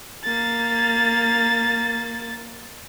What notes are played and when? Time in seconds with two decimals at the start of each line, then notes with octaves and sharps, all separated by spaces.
0.24 A#3 A6